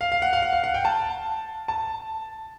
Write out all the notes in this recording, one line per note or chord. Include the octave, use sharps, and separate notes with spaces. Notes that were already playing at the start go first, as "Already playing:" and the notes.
F5
F5
F#5
F5
F#5
F5
F#5
G5
A5
A5